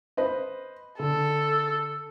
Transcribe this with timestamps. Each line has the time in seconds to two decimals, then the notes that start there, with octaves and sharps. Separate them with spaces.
0.17 B4 C5 D#5
0.99 D3 A4